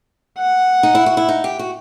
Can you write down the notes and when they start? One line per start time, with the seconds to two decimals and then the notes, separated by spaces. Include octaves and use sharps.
0.38 F#5
0.83 D#4
0.95 E4
1.06 F#4
1.17 E4
1.29 D#4
1.44 G4
1.59 F#4